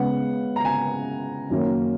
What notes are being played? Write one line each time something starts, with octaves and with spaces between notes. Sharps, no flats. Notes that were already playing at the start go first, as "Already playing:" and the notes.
Already playing: C#3 G#3 B3 F#5
A#5
G#5
F#2 D#3 A#3 C#4